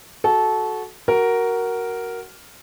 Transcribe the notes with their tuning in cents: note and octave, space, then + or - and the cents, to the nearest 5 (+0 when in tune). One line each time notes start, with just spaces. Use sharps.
F#4 +0 A4 -20
F#4 +15 A#4 +0